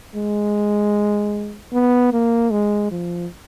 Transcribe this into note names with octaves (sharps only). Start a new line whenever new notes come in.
G#3
B3
A#3
G#3
F3